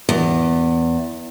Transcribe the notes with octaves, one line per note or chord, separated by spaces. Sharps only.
E2